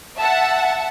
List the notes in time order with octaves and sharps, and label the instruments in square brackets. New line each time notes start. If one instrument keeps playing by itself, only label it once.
[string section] E5 F#5 A5